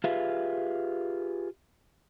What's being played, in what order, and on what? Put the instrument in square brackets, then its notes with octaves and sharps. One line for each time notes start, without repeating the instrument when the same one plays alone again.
[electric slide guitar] F4 G4 G#4 B4 E5 F5